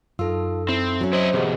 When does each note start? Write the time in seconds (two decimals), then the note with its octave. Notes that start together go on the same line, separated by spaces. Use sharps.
0.19 F#2 D#4 F4 A4 E6
0.69 C4 E4
1.01 F#3 C#4
1.13 E4 C5 D#5
1.33 B1 E2 G4 G#4 D#5